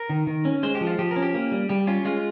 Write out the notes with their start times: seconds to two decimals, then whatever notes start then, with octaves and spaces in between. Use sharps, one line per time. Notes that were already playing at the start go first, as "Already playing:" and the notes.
Already playing: A#4
0.10 D#3
0.27 D#3
0.45 C#4
0.63 G#3 C5
0.75 G4
0.81 F3
0.87 F4
0.99 F3 G4
1.11 A#4
1.16 C#4
1.22 G4
1.34 A#3
1.52 G3
1.69 G3 G4
1.87 C#4 F4
2.05 G#3 F4